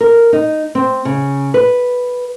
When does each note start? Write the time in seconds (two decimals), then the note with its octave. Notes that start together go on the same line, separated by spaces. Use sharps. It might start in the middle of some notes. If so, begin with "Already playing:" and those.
0.01 A#4
0.33 D#4
0.75 C4
1.05 C#3
1.54 B4